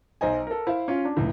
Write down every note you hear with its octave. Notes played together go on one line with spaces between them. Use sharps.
B1 C5 D#5 G#5
A4 A#4
E4 C5 E5 F5
C#4 F4
D4
F1 C#2 A2